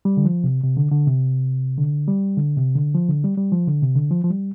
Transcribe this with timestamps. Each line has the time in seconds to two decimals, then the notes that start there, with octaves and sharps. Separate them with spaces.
0.05 G3
0.17 D3
0.25 F3
0.44 C3
0.63 C3
0.77 D3
0.91 D3
1.07 C3
1.78 D3
2.08 G3
2.37 D3
2.57 C3
2.76 D3
2.95 F3
3.09 D3
3.24 G3
3.37 G3
3.52 F3
3.67 D3
3.82 C3
3.95 D3
4.11 F3
4.24 F3
4.30 G3